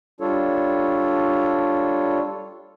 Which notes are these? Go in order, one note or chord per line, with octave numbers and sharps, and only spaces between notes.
G3 D4 F4 A4 C#5